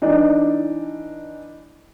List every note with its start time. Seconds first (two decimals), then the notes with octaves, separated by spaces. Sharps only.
0.02 E3 D4 D#4